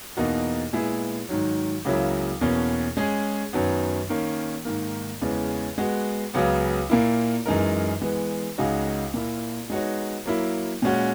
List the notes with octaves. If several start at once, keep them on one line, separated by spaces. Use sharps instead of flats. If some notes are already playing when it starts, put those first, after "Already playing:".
E2 B2 A#3 D#4 F#4
A#2 G#3 B3 E4 G#4
G#2 D#3 F#3
C#2 C#3 F#3 A#3 E4
E2 B2 A#3 C#4
G#3 C#4 G#4
F#2 D#3 F#3 B3
D#3 A#3 C#4
G#2 D#3 A#3
E2 C#3 E3 G#3 C#4
G#3 B3 F#4
C#2 C#3 F#3 B3
A#2 A#3 E4
F#2 E3 G#3 D#4 A#4
E3 G#3 B3
C#2 C#3 G#3 D#4 F#4
A#2 A#3 E4
G#3 B3 D#4 F#4 C#5
F#3 A#3 E4
A#2 G#3 C#4 F#4